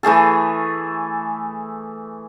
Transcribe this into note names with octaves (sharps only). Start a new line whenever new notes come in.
E3 A3 G#4 A4